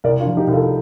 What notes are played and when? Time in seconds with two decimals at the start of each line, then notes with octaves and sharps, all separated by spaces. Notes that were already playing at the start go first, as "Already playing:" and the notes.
0.04 C2 A#4 D5
0.20 D4 F4
0.26 F3
0.37 D#4 G4
0.47 C2
0.53 F4 A4